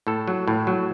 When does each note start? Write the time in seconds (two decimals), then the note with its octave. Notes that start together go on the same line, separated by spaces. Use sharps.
0.07 A2 A4
0.28 F#3
0.48 A2
0.67 F#3